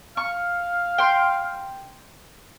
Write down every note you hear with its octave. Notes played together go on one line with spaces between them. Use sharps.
F5 C#6
G5 C6